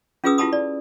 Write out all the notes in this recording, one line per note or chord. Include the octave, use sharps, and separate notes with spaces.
C#4 F4 G#4 B4 D#6 E6
E4 F4 G4 A5 B5 D#6
D5